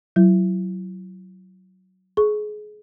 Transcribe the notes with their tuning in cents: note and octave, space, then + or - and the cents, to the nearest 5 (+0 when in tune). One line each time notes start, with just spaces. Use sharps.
F#3 +10 E4 +30
G#4 +25 C#6 +0